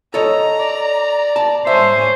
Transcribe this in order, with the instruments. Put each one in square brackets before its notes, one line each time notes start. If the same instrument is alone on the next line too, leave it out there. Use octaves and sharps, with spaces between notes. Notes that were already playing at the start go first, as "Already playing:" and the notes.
[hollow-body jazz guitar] A4 C#5 D#5 [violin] A#5
[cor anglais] D5
[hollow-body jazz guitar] A5
[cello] C5 [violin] C#5 G#5 [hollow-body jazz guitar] E5